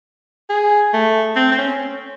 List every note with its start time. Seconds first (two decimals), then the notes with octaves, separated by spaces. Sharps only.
0.50 G#4
0.93 A3
1.36 C4
1.51 C4
1.58 C#4